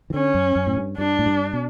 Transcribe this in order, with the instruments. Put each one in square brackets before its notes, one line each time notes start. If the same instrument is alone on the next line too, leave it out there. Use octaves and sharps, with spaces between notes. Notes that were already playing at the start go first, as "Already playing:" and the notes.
[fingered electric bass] E3
[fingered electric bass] D3 [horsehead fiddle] C#4
[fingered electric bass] F#2
F#2
A2
G2
[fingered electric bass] G2 [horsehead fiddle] D4
[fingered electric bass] A2
G2
B2